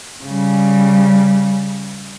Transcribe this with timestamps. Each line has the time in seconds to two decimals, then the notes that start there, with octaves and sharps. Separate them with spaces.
0.24 C#3 G3